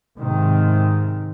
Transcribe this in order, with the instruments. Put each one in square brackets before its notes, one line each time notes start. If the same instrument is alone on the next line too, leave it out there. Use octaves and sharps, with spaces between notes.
[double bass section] G#2 C3 D#3